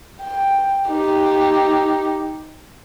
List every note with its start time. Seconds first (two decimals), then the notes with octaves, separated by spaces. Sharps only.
0.22 G5
0.88 D#4 G4